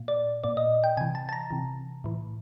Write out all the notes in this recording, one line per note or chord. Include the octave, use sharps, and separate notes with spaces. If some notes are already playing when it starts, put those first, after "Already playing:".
Already playing: A#2
D5
A#2 D5
D#5
G5
C3 E3 G#5
A5
A5
A#5
C3 E3
A2 E3